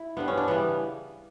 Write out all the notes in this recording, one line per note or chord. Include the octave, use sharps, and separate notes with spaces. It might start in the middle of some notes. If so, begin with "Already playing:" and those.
Already playing: E4
G2 D3 G3 B3
C#4
D4
C#3 E3 G3 B3